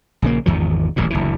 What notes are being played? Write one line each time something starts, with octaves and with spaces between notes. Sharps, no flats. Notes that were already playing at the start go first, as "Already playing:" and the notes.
A#1 C#3 A#3
G#1 E2 D#3 F3
D#1 A1 E2 A#2
F#1 D2 E3